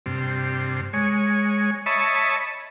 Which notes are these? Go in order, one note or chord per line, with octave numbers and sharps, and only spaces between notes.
G2 C3
G#3 C#5
C#5 D#5 E5 A5 B5 C#6